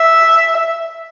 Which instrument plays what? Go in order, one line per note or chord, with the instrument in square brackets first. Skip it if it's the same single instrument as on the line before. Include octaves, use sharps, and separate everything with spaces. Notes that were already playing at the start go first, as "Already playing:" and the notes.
Already playing: [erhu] E5